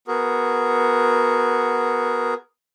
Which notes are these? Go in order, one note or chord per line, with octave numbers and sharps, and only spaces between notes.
B3 F#4 G#4 A#4